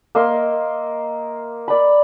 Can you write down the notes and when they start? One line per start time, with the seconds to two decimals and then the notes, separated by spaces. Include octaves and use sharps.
0.15 A#3 D#5 E5 C6
1.68 D5 B5